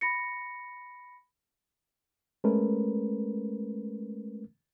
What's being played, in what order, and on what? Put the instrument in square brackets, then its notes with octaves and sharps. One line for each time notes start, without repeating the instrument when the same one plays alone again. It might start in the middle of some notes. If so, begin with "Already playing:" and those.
[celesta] B5 A#6 C#7
[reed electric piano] G#3 A3 C#4 A#4 B4